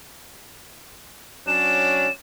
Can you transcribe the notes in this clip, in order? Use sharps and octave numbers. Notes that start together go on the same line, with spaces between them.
F#3 C#4 D4 E7